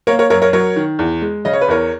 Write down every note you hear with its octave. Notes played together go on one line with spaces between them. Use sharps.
A#3 A#4 C#5
A#4 C#5
F#2 A#4 C#5
A#4 C#5
F#3 A#4 C#5
D#3
E2
G#3
C#3 D#5
C#5
B4
E2 A#4 C#5